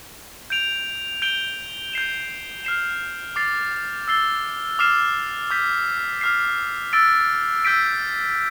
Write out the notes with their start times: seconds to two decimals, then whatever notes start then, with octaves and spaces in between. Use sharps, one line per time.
0.50 G6 D7 F7
1.22 G6 D7 G7
1.93 G6 C7 E7
2.65 F6 C7 E7
3.36 D6 A6 C7
4.08 E6 A6 C7 G7
4.79 D6 F6 C7 E7
5.50 D6 G6 B6
6.21 D6 F6 C7
6.93 E6 A6 D7
7.65 E6 G6 B6 D7